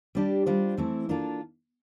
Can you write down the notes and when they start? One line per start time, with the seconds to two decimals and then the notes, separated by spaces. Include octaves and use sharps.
0.15 G3 D4 G4 D5
0.46 G3 D4 F4 C5
0.77 E3 A3 C4 E4
1.09 A#3 D4 F4 A4